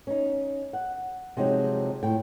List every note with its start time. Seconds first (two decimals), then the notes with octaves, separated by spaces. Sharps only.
0.07 C#4 D#4
0.73 F#5
1.37 C3 F3 F#3 G#3 D#4
2.03 A2 G5